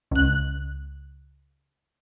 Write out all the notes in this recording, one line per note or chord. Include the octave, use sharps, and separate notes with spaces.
C#2 F#6